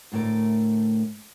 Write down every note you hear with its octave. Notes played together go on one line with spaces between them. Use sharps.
D2 A2 A3 A#4 D5